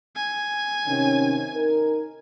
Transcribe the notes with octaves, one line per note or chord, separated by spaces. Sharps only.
G#5
C3 D#3 C#4
D#4 A#4